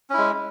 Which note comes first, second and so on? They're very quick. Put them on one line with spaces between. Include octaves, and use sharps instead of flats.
C#4 E4 G#3